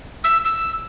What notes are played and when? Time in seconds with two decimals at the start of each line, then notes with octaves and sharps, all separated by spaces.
0.24 E6
0.45 E6